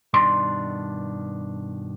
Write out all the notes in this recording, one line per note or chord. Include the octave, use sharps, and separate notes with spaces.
G2 B2 D#3 D4 C6